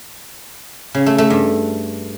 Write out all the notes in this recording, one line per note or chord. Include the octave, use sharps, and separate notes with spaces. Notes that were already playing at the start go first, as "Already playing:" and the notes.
C#3
A3
A3
G2